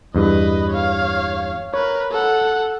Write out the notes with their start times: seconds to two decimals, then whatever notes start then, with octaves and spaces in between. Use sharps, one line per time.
0.15 E2 G2 B4 D#5
0.69 C#5 F5
1.74 A#4 B4 C#5
2.11 A4 F#5